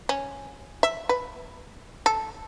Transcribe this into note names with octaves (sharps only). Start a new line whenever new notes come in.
C#4
E5
B4
A4